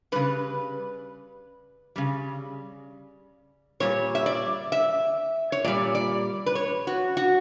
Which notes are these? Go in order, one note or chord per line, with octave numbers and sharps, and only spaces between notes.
C#3 G3 B4
C#3 G3
A#2 G3 C#5
E5
D5
E5
C#5
A#2 G3 D5
D5
B4
C#5
F#4
F#4